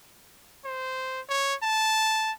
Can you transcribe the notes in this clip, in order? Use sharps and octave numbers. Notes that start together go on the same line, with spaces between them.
C5
C#5
A5